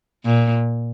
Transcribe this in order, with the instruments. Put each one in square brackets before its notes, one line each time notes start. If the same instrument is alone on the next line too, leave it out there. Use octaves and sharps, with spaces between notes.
[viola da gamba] A#2